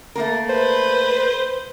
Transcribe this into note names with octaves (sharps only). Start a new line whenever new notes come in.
A3 A#3 A#4
B4 C5